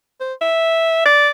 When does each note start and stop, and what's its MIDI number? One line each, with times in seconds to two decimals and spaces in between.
0.21 0.33 72
0.42 1.02 76
1.06 1.30 74